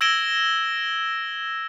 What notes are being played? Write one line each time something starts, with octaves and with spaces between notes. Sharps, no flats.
E6 G#6 A#6 D7 E7 G7